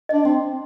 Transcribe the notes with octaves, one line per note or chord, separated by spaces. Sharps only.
D4 D#5
C4